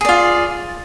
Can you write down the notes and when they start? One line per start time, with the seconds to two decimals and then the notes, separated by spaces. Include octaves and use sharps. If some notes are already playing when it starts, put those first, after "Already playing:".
0.01 G#4
0.05 D5
0.09 F4